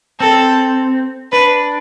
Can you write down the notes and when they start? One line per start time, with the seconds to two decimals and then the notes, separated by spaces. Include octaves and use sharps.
0.20 C4 A4
1.32 D4 B4